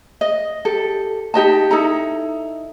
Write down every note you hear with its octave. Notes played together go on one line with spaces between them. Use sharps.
D#5
G4 A4
D#4 G4 D#5 A5
D#4 E4 A4 A#5